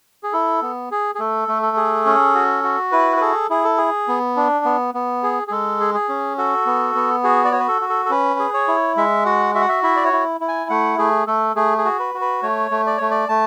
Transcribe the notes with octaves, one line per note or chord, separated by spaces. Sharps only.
G#4
E4 A4
B3
G#4
G#4
A3 A4
A3
A4
G#4
C#4
F#4
F#4
E4 B4
B4
G#4 A4
E4 G#4
A4
G#4
B3
D4
B3
B3
G#4
G#4
G#3 A4
G#4
G#4
C#4
F#4 A4
B3
B3
F#4 G#4
D5
F#4 C#5
B4
A4
F#4
A4
A4
C#4 B4
G#4
C#5
E4
G#3 E5
F#4 F#5
F#4 E5
F#5
E5
E4 E5
D5
C#5
E4
E4
G#5
A3 F#5
A3 G#4
A3 A4
A3 G#4
G#4
F#4
B4
F#4
B4
A3 C#5
A3
D5
A3 C#5
D5
A3 A5